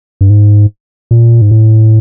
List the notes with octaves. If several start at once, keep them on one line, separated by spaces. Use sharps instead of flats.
G2
G#2
A#2
G#2
A2